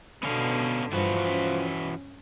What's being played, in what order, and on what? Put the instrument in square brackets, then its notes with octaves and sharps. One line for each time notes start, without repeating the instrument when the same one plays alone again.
[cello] B2 D3 [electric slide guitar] B3 C#4 F5
[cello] G2 [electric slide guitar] E3 F#4 B4 [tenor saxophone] F3
[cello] C#4